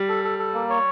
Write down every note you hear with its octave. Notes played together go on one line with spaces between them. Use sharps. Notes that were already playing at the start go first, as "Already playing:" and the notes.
Already playing: G3
A4
A4
A4
A#3
C#5